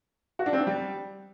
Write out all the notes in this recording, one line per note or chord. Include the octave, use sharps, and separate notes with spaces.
F#4
D4
C4
D4
G3